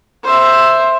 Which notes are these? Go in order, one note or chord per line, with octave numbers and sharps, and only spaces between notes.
C5 E5